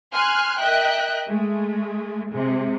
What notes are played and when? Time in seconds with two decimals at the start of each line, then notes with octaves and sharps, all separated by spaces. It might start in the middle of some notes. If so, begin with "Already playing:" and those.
0.12 G#5 C6 F6 F#6
0.59 A#4 D#5 E5 G5 F#6
1.27 G#3 A3
2.32 C3 G#3